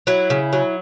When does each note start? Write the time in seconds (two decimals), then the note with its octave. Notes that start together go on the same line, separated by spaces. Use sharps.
0.07 F#3 E4
0.30 C#3
0.53 F#3